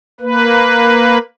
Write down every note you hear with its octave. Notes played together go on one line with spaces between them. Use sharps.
A#3 B4